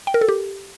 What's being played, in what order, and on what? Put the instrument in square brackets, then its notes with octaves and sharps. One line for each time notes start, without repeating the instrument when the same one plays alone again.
[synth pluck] G5
A#4
A4
G4